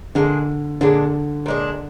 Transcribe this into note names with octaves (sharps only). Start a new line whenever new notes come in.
A#2 D3 G#3 D4
A#2 D3 G#3 D4
A#2 G#3 D4